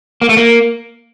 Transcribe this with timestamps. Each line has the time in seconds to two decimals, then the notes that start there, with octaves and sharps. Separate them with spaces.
0.22 A#3
0.29 A3
0.37 A#3